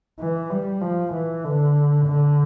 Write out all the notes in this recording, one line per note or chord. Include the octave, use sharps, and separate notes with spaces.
E3
G3
F3
E3
D3
D3